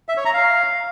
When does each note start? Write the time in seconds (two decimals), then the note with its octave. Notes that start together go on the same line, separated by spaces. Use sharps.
0.09 E5
0.17 C#5
0.25 A#5
0.34 F5